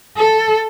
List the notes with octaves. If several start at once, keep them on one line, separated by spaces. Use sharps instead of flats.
A4